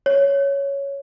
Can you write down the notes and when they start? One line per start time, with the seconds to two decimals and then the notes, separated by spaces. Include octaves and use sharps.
0.06 C#5